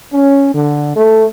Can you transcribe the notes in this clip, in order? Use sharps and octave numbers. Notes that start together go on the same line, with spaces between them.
C#4
D3
A3